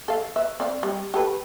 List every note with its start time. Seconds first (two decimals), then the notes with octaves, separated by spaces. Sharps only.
0.08 A4 F5
0.36 B4 E5
0.60 C4 D5 F5
0.83 G3
1.14 G4 A4 B4